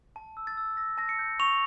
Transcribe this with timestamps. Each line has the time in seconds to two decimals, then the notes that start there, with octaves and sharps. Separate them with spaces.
0.16 A5
0.37 E6
0.47 A6
0.57 E6
0.77 E6 A#6
0.98 A5 A#6
1.09 C#7
1.19 G6
1.40 C#6 F7